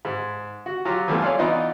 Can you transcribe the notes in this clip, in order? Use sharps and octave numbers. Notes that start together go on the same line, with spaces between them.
G#2
F#4
F#3 F4 G4
E3 G3 A3 B3 F4
C#5 D5 F5 G#5 C6
E3 B3 D#4 F4 D5 D#5